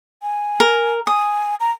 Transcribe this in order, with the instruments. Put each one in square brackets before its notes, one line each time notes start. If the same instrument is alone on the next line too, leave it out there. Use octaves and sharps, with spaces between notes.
[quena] G#5
[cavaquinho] A#4
[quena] G#5 [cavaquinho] D#6
[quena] A#5